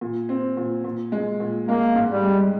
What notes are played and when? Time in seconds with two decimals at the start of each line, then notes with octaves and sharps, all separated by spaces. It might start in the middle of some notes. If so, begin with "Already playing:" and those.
0.01 A#2
0.29 C4
0.57 A#2
0.84 A#2
1.12 G#3
1.40 A#2
1.67 G#3 A#3
1.96 G#2
2.10 G3
2.23 G#3